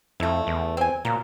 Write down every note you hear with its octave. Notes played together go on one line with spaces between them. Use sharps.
F2 A3 E4
E2
C4 G#5
A#2 F#3 A#3